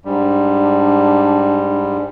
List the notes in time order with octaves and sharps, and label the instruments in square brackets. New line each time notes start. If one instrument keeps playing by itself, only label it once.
[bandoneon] G#2 G3 [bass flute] D4